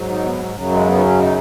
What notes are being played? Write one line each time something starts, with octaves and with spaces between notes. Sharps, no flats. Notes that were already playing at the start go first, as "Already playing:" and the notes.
Already playing: G#2 F#3
D#4
B3
F#2 C#3 F#3
G#3
B3
D#4
C#4
D#4